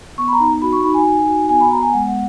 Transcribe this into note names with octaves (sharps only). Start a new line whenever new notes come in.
B3 C#6
B5
A#5
D#4
F#4 B5
C#6
D#4 B5
G#5
D#4
F#4
B3 G#5
B5
B3 A#5
G#5
G#3 F#5
F#5